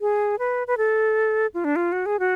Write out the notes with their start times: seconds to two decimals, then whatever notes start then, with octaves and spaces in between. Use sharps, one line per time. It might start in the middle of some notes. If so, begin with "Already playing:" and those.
0.01 G#4
0.39 B4
0.67 B4
0.78 A4
1.54 F4
1.64 D4
1.76 F4
1.92 F#4
2.06 G#4
2.19 F#4